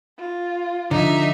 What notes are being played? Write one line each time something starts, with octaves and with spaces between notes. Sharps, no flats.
F4
D3 F3 D#4 E5